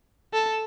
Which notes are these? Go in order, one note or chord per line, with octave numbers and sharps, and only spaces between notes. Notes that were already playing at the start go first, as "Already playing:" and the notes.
A4